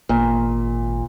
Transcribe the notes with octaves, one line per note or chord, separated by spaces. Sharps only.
G#1 A#2